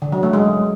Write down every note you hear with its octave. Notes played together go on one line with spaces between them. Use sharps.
D3
F#3
A3
G#3